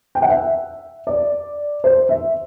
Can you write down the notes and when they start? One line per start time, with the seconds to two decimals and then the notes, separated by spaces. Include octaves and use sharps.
0.15 G5
0.22 F#5
0.30 E5
1.07 D5
1.84 C5
2.09 E5